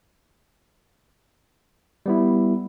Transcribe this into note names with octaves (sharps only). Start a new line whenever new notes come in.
G3 B3 E4